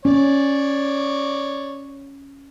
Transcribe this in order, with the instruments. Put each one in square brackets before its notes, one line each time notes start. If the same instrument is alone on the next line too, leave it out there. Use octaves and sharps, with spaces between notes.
[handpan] C#4 [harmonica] C#5 D5